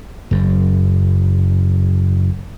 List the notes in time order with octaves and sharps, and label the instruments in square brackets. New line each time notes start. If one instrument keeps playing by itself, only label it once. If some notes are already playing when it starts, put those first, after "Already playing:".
[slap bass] F#1 F#2